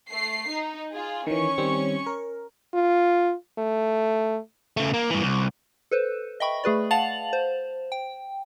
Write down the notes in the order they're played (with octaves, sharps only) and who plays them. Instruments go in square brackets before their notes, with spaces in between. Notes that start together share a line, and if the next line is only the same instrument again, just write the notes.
[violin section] A3 C7
D#4
F4 G#4
[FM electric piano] D#3 E3 [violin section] C#4 C#6
[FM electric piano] D#3 G3 C4
A#4
[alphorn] F4
A3
[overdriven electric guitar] C#3 A3
A#3
G2 E3
C2
[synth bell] A4 B4 C5
D#5 E5 G5 B5 C#6
A3 G#4 B4 D5
F5 F#5 A5 A6 F7 F#7
C5
G5